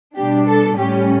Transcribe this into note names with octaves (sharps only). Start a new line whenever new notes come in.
B2 G3 D4 G4
A4
A2 G3 C#4 G4